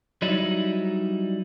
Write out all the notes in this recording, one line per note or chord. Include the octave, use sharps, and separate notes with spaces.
F#3 G3 D#4 E4